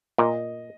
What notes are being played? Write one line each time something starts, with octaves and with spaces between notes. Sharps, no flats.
A#2 D#5